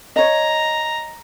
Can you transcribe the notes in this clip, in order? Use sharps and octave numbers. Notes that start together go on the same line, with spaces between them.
C#5 D#5 A#5